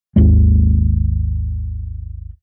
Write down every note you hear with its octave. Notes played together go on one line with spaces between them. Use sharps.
G#1 D#2 G#3